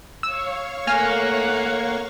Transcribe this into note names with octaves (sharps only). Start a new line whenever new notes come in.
C#5 F5 C#6 E6
A3 A#3 F#5 G#5 F6